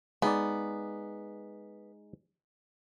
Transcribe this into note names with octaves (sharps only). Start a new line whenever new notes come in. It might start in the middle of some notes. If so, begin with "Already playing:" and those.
G#3 B3 D#4 D5